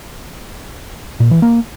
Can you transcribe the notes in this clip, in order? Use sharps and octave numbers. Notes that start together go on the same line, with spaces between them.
A#2
E3
A#3